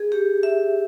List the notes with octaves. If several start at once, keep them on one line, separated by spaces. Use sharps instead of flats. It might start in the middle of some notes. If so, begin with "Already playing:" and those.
Already playing: G#4
G4
E5